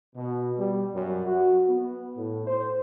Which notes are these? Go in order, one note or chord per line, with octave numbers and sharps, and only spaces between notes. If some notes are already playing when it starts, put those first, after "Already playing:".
B2
G3
F#2
F#4
B3
A2
C5